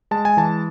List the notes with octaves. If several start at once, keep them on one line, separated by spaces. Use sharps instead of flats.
G#3 A5
G#5
E3 A5